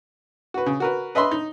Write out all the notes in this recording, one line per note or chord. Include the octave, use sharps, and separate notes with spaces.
F#4 B4
C#3
F#4 A#4 B4
B4 D#5 E5 B5 C6
D#4